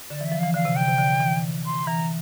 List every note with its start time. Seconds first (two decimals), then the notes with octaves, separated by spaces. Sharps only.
0.10 D3 D5
0.21 E3 E5
0.32 F3
0.39 E3 F5
0.54 D3 F5
0.65 C3
0.76 D3 G5
0.88 C3
0.98 D3
1.20 E3
1.66 C6
1.87 E3 A#5